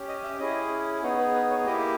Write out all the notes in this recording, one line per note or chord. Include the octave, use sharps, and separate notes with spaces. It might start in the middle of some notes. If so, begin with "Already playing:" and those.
Already playing: C#4 G4
D#5
E5
C#4 E4 G#4 D#5
B3 D#4 G#4 C#5
B4
B4
C#5
A#3 E4 G4 D#5